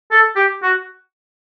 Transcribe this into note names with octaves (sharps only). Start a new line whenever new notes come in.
A4
G4
F#4